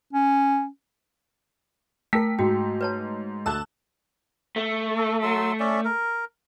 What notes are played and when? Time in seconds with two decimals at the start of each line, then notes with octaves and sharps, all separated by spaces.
0.13 C#4
2.13 A3 A#4 G5 B6
2.39 G#2 F#4 G5
2.81 B4 C#5 A5
3.46 D2 A4 A5 D6 E6 F#6
4.56 A3
4.97 A4
5.23 F#3 C6 E6
5.60 C#4 D5 E5
5.85 A#4